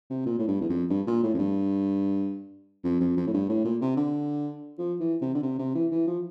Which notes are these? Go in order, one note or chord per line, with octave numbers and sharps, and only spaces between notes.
C3
A#2
A2
G2
E2
F2
G2
A#2
A2
F2
G2
F2
F2
F2
A2
G2
A2
A#2
C3
D3
F3
E3
C3
D3
C3
C3
E3
E3
F3